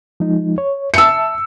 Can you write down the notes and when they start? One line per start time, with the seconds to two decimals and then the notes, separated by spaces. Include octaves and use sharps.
0.20 F3 G#3 D#4
0.58 C#5
0.94 E5 A5 E6 C#7